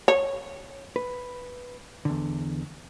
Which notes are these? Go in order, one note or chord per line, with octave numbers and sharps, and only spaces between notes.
C#5
B4
E2 D3